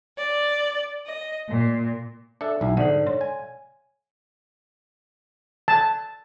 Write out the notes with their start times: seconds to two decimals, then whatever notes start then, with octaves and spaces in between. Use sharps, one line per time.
0.16 D5
1.05 D#5
1.50 A#2
2.41 D4 A4 E5
2.61 B1 E4
2.77 G#2 D3 A4 D5 F#5
3.06 C#5 C6
3.21 G#5
5.68 A5